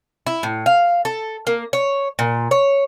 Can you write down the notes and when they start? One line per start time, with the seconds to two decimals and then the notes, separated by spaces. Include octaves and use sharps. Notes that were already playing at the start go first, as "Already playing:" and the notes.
0.26 E4
0.43 A2
0.66 F5
1.05 A4
1.47 A#3
1.73 C#5
2.19 A#2
2.51 C#5